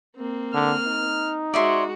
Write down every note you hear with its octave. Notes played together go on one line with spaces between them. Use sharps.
A#3 C4
D3 F6
D#4
G#3 F#4 C#5 D5 E5 C6